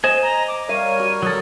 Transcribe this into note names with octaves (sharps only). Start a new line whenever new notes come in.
C5 D#5 G#5 E7
A#5
D6
G3 A#4 C#5 F5 D#7
F#4
F#3 A4 D#6